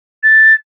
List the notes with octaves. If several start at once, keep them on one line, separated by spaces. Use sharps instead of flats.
A6